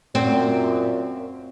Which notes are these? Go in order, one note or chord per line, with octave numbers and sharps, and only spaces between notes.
F#2 A#2 C4